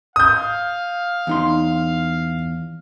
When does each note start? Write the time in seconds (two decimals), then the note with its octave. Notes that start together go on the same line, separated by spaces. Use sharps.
0.16 F5 D#6 G6
1.27 E2 D#4 C6